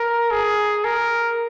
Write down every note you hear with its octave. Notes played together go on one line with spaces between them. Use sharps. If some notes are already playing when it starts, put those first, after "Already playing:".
Already playing: A#4
G#4
A#4